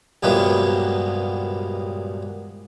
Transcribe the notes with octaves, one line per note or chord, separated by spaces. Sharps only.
C2 G2 A#2 F#3 G#3 B3